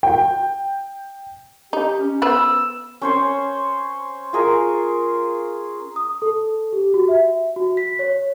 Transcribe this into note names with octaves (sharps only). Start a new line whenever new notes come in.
G5
D#4 G4
C#4
B3 B4 C5 E6
C#4 C5 C#5
F4 G#4 A#4
D#6
A4
G4
F#4
E5
F#4
B6
C#5